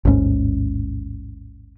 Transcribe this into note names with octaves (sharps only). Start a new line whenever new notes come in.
A1 D#2 G#2 C#4